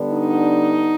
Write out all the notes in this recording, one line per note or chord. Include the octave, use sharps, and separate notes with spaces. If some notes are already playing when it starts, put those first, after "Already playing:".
Already playing: D3 G3 B3 D4
D#4